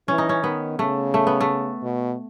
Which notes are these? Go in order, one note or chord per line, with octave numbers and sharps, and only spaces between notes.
E3 C#4
D#4
C#4
D#3 B3
C#3 A3
A3
B3
A3
B2